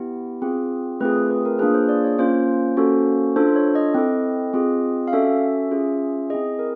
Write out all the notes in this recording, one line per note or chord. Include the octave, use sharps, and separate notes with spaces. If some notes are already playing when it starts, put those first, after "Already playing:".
Already playing: B3 E4 G4
C4 F4 G#4
A3 C4 F4 G#4 B4
B4
A#4
A#3 D4 F4 G#4 B4
C5
D5
C#5
A#3 C#4 F4 C5
A#3 C#4 F#4 A4
D4 F4 A4 C5
C#5
D#5
C4 E4 A4
C4 F4 G#4
F5
C#4 F#4 A4 E5
C#4 F4 G#4
C4 E4 G#4 D#5
A#4